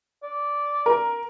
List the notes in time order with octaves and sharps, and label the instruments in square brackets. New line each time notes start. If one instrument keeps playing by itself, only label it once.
[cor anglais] D5
[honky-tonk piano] A#4